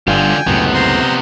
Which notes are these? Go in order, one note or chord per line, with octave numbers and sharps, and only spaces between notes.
G1 G2 D3 F4 G5 G#5
C#2 F#2 A2 C3 B3
C5 A#5 C6